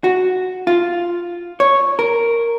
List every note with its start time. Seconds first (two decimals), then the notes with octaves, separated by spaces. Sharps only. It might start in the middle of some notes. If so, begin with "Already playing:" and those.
0.04 F#4
0.67 F4
1.60 C#5
1.99 A#4